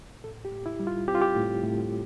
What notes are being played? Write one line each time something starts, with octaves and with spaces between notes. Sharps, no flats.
A2 A4
G4
A2
E4
G3
F4
C4 G4
F4
G4
A2
A2